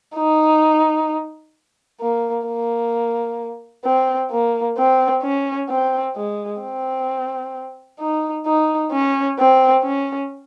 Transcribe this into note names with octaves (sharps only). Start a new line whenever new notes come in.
D#4
A#3
A#3
C4
A#3
C4
C#4
C4
G#3
C4
D#4
D#4
C#4
C4
C#4